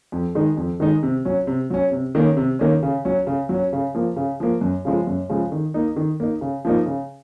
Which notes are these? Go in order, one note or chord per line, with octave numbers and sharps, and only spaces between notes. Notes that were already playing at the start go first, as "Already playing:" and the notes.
F2
D#3 G#3 D#4
F2
D#3 G#3 D#4
C3
F#3 C#4
C3
F#3 C#4
C3
D#3 A#3 C#4
C3
D#3 A#3 C#4
C#3
F#3 C#4
C#3
F#3
C#4
C#3
F3 A#3
C#3
F3 A#3
F#2
C#3 F3 G#3
F#2
C#3 F3 G#3
D#3
A#3 D#4
D#3
A#3 D#4
C#3
F3 A#3 D#4
C#3